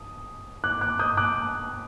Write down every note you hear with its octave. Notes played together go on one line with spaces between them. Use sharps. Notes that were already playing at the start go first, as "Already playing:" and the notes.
Already playing: D#6
D6 F#6
D6 F#6
D#6 G6
D6 F#6